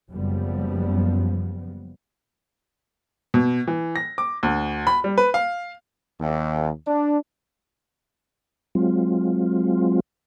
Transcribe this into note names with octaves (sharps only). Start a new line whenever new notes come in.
F#1 F#2 F3 G3 B3
B2
E3
A#6
D6
D2
B5
G3
B4
F5
D#2
D4
F#3 G#3 C4 F4